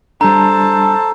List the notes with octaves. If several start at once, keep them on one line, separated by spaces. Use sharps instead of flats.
G3 D4 A4 C5 A5 A#5